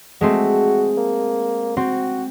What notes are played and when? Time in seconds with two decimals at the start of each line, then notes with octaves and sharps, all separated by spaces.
0.21 G#3 A3 C4 F#4
0.97 A#3
1.77 C4 F#4